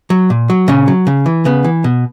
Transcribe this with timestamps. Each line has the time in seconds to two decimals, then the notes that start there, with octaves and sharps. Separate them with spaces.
0.10 F#3
0.30 A#2
0.50 F#3
0.68 A#2 C#3 C#4
0.88 F#3
1.07 C#3
1.26 E3
1.45 C#3 B3
1.64 E3
1.84 B2